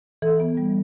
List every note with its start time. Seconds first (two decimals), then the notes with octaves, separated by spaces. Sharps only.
0.22 E3 A4
0.40 B3
0.57 G3